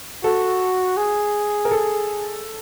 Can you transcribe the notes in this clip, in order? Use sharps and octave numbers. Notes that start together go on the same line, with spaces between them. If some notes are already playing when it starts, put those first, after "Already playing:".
F#4 A4
G#4
A#4
A4